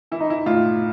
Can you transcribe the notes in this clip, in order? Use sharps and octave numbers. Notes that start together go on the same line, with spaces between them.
E3 E4
D#4
E4
A2 F4